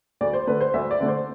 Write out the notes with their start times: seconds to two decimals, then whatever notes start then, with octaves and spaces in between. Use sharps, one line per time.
0.21 D2 D5
0.33 C5
0.47 D3 A3 B4
0.61 C5
0.74 D2 E5
0.91 D5
1.00 D3 A3
1.08 C5